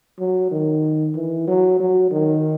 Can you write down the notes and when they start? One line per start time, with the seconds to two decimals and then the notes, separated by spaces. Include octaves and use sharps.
0.19 F#3
0.51 D#3
1.15 E3
1.47 F#3
1.80 F#3
2.11 D#3